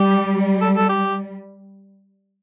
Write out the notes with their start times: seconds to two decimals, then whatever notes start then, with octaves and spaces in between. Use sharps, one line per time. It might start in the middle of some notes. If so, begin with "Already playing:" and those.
Already playing: G3 G4
0.61 A4
0.76 A4
0.89 G4